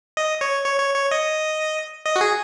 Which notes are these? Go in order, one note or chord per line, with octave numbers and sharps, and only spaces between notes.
D#5
C#5
C#5
C#5
C#5
D#5
D#5
F#4
G#4